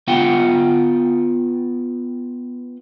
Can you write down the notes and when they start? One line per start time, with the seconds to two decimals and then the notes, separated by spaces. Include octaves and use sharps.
0.08 B3 F4 F#5 G5